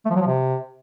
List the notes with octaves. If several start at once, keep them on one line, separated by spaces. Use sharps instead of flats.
A3
F3
F#3
F3
C3